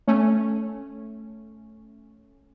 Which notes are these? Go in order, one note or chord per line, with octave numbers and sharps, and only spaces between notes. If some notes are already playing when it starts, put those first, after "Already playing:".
A3 C#4